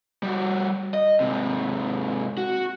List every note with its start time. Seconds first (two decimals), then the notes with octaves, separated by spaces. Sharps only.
0.23 G3 F#4
0.94 D#5
1.20 G#2 C3
2.38 F#4